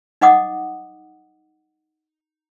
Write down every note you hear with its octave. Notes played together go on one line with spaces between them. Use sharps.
D#4 D#5 F#5 D6 D#6